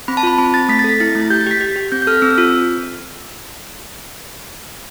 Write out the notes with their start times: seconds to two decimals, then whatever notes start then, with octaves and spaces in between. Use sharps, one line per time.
0.08 C4 B5
0.17 A5
0.23 F4 B5
0.39 C4 B5
0.54 C4 A6
0.69 A3 B6
0.79 A6
0.84 A4 B6
1.00 E4 A6
1.15 A3
1.21 A6
1.30 G4 G6
1.41 A6
1.46 G4 B6
1.61 G4
1.76 G4
1.92 C4 G6
2.02 G6
2.07 A4 F6
2.22 C4 E6
2.38 F4